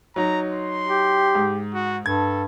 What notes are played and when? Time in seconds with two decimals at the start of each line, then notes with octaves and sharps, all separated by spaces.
0.16 F#3 D#4 A#5
0.52 C6
0.87 G4
1.35 G#2
1.74 F#4
2.06 G2 A4 G#6